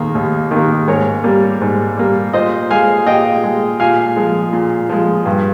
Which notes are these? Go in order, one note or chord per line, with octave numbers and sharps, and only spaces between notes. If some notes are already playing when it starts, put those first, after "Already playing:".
Already playing: D#2 D#3 A#3
D#2
D#3
A#3
G#2 A#4 C#5
G3 A#3
G#2
G3 A#3
A#2 C5 D#5
G#3 F5 G#5
A#2 D#5 G5
G#3
A#2 F5 G#5
F3 G#3
A#2
F3 G#3
G2